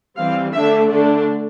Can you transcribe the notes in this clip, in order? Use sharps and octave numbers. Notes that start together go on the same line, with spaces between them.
E3 G3 C4 F5
D3 A3 D4 E5
D3 A3 D4 A4